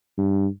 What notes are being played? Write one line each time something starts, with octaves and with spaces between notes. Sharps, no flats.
G2